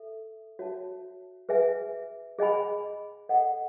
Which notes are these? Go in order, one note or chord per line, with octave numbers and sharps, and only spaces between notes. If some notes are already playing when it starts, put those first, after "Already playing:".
Already playing: A4 E5
F#4 C#5 E5 A5
G#4 B4 E5 G#5
G#4 D#5 G#5 B5
A4 D#5 F#5